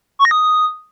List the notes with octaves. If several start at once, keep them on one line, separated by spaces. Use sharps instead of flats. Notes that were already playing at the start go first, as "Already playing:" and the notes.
C#6
A#6
D#6